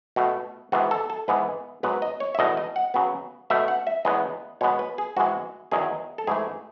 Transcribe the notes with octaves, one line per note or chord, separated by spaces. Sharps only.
B2 A3 F#4
G#2 E3 B3 F#4
A4
A4
G#2 E3 G#3 B3 B4
G#2 F#3 B3 B4
D#5
C#5
E5
E2 B2 A3 D#5
D#5
F#5
C#3 F#3 B3
B2 A3 E5
F#5
E5
E2 C#3 G#3 B3 D#5
B2 G#3 B3 C#5
B4
G#4
G#2 E3 G#3 F#4
E2 D#3 F#3 G#4
A4
G#2 E3 A3 G#4